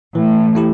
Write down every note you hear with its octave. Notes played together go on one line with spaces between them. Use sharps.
A2 E3
A3 E4 G4